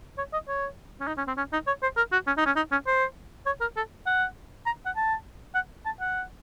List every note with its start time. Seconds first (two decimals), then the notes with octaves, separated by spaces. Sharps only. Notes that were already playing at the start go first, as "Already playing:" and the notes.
0.18 C#5
0.33 D#5
0.48 C#5
1.01 C#4
1.07 D#4
1.18 C#4
1.27 C4
1.37 C#4
1.53 D#4
1.67 C#5
1.83 C5
1.97 A#4
2.12 F#4
2.27 C#4
2.38 D#4
2.46 C#4
2.56 D#4
2.72 C#4
2.87 C5
3.46 C#5
3.61 A#4
3.77 A4
4.07 F#5
4.66 A#5
4.86 F#5
4.96 A5
5.55 F#5
5.85 A5
6.00 F#5